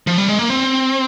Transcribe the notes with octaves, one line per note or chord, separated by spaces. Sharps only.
F3
G3
G#3
A#3
C4